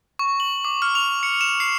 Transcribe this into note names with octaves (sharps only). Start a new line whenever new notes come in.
C#6
F#7
D6
F6
F7
C#7
E7
C7